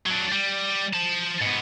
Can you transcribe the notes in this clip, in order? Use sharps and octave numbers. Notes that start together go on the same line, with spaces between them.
F#3 D4
G3
C5 A5
G#2 B3